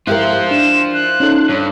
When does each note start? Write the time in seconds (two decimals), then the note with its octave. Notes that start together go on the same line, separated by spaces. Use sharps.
0.07 E4 F4 G4 A#4 C5 F#6
0.25 E5
0.51 D4 E7
0.94 F#6
1.20 C#4 D#4 A4
1.49 G2 C#5